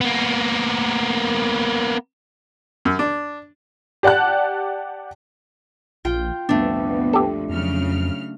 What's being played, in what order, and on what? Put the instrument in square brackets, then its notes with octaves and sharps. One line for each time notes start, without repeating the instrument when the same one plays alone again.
[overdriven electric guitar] A#3 B3
[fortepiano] F#2
D4
[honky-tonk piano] G4 D5 F#5 A5 F#6
[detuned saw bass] A#1 [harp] F4 G5
[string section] C2 F2 A#2 [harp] A3 D4 [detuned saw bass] B3
[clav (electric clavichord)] G4 A4
[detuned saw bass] F2 [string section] C#3 F#3 F6